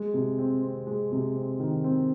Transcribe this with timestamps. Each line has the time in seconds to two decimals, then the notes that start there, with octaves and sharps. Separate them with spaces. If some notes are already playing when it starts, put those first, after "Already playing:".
Already playing: G#3
0.14 C3
0.39 C4
0.62 C4
0.87 G#3
1.12 C3
1.36 C4
1.60 D#3
1.84 C4